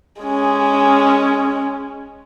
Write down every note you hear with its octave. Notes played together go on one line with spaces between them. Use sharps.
G#3 C#4